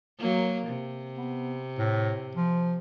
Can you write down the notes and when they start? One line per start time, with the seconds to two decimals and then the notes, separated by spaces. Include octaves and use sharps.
0.19 F#3 A#3
0.67 C3
1.18 B3
1.78 A2
2.35 F3